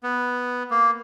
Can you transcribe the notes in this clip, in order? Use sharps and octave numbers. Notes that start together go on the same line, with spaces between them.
B3
A#3